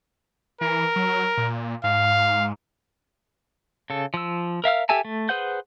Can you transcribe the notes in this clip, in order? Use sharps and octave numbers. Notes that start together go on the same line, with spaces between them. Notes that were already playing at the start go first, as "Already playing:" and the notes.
E3 A#4
F#3
A#2
G#2 F5
C#3 A4
F3 E6
A#4 E5 F5 F6
G4 A4 E5 G#5 A5
A3
G#4 B4 C5 F#5 G6